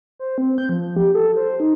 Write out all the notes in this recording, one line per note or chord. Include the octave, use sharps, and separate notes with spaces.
C5
C4
G6
F3
G4
A4
C5
D#4